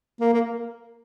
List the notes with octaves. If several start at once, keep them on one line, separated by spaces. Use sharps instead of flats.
A#3
A#3